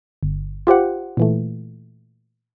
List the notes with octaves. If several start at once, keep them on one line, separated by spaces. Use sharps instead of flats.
G1
F4 G4 C5 F#5
A#2 E3 A3